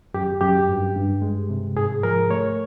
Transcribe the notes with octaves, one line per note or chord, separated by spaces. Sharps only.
F#2 G4
F#2 G4
G2
G2
G#3
C3
G#2 G#4
F3 A#4
A3 C#5